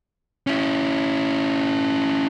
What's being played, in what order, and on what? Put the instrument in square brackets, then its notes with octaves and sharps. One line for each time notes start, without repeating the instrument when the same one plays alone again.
[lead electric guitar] C#4 E4